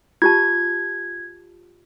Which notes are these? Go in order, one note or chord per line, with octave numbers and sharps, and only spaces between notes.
F4 G4 A5 G#6